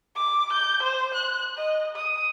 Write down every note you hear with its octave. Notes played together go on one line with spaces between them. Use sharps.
D6
G6
C5
F#6
D#5
D#6